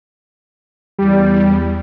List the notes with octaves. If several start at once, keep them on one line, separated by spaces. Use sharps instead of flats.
E2 G3